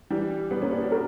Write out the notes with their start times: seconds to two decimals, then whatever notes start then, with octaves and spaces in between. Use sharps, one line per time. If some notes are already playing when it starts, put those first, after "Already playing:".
0.11 E3 G3
0.51 G3 B3
0.62 A#3 C#4
0.71 B3 D4
0.82 D4 F#4
0.92 A#4